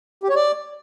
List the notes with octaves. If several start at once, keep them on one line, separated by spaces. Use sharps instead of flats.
G4
C#5
D5